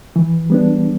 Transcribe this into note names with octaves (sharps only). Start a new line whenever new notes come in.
E3
G3 B3 D4